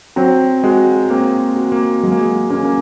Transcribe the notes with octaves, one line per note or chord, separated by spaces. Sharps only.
F#3 C4
G#3 F#4
A#3 C4
F#4
A#3
F#3 G#3
A#3
G#3
A#3 C#4
A#3